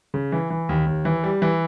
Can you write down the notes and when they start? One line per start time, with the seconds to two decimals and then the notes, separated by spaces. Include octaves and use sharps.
0.14 C#3
0.32 E3
0.50 E3
0.69 D#2
0.86 D#2
1.05 E3
1.24 G3
1.42 E3